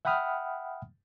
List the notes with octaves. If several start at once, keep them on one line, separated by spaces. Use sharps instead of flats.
E5 F#5 G5 B5 D#6 F6